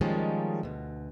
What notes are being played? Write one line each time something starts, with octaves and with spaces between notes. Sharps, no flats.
D#3 F3 G3 G#3 A#3 C#4
D2 B2